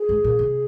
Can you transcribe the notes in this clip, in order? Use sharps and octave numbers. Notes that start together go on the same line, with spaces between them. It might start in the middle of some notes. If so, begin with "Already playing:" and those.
Already playing: G#4
G#2
A#2
C3